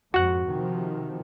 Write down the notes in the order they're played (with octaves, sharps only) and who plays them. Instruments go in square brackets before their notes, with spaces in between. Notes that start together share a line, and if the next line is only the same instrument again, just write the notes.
[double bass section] F2 G#2 [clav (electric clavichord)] F#4 F#5
[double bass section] C3 D#3 F3